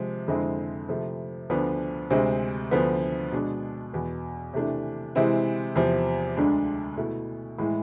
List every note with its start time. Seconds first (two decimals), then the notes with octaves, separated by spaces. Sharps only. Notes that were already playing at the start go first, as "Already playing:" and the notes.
Already playing: C3 F3 G#3
0.28 F2 D3 G#3 C4 E4
0.89 C3 F3 A3
1.50 D2 D3 F3 B3 D4
2.10 D2 C3 G#3 C4
2.71 D2 D3 F3 B3
3.32 B2 G#3 D4
3.93 E2 B2 B3
4.54 C3 E3 A3 D4
5.15 C3 E3 G#3 C4 E4
5.75 E2 C3 F3
6.37 D2 D3 G#3 D4
6.97 B2 A3 E4
7.58 A2 E3 G#3